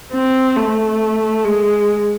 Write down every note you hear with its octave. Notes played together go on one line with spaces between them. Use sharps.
C4
A3
G#3